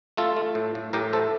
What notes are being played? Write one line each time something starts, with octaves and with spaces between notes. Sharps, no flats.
A3 F4 A4
A3
A2
A2
A2 G4 A#4
A3 A4 C5